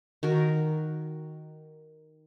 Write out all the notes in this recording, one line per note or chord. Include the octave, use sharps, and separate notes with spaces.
D#3 F#4 A#4